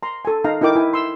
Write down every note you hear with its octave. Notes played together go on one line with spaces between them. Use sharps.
A#5 C6
A4 G#5
D#4 F5 A#5
D#4 E4 A#4 G5 D6
E4 G#5
C6 E6